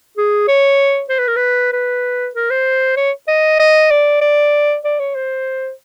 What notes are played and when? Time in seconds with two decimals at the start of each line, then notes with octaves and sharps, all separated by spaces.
0.17 G#4
0.48 C#5
1.10 C5
1.19 B4
1.28 A#4
1.36 B4
1.72 B4
2.35 A#4
2.51 C5
2.97 C#5
3.28 D#5
3.59 D#5
3.91 D5
4.21 D5
4.84 D5
4.99 C#5
5.15 C5